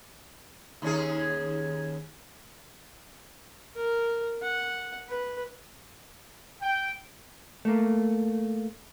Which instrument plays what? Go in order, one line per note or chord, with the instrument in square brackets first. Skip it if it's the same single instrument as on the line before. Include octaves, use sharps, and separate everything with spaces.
[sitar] D#2 C#4 G#4
[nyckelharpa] A#4
F#5
B4
[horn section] G5
[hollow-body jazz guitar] A3 A#3